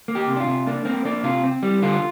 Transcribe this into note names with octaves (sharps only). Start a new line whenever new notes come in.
A#3
G4
C3
D4
F4
C3
A#3 D4
A#3 C4
A#3 D4
C3 F4
C4
G3
D3 F4